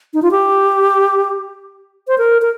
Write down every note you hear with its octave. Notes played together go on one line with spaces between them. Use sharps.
D#4
F4
G4
C5
A#4
A#4